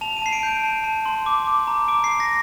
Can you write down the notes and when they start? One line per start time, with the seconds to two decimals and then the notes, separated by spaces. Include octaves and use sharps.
0.01 A5 F7
0.17 D#7
0.22 A5 C7
0.33 D7
0.43 G6
0.49 D7
0.64 A5
0.84 A5
1.06 C6
1.26 D6
1.47 D6
1.67 A#5
1.88 D6 D7
2.04 C7
2.10 D6
2.20 A#6